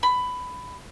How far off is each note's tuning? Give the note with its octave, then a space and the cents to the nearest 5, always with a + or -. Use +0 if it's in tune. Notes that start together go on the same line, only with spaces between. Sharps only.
B5 +15